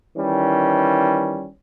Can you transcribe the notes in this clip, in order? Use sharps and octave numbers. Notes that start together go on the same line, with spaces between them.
D#3 E3 G3 C#4